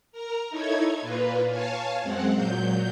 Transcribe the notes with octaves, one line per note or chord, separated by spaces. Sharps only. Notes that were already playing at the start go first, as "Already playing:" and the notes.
A#4 A#5
D#4 E4 A4 C#5 G#6
A#2 A#3 F4 B4
C#5 F5 G#5 A5
F#2 G#3 C4 F#5
A#2 F#3 G6